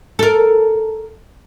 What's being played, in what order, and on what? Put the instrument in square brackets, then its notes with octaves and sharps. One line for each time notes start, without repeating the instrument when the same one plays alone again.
[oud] A4 A#4